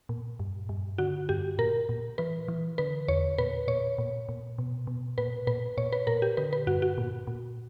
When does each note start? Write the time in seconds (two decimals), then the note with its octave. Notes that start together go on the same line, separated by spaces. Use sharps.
0.09 A#2
0.39 G2
0.69 G2
0.98 D3 F#4
1.29 G2 G4
1.58 A#2 A#4
1.89 A#2
2.18 E3 B4
2.48 E3
2.78 D3 B4
3.08 E2 C#5
3.38 A#2 B4
3.68 A#2 C#5
3.98 A#2
4.29 A#2
4.58 B2
4.87 B2
5.18 A#2 B4
5.47 A#2 B4
5.77 A#2 C#5
5.92 B4
6.07 A#2 A#4
6.22 G4
6.37 D3 B4
6.53 B4
6.67 G2 F#4
6.82 F#4
6.98 A#2
7.27 A#2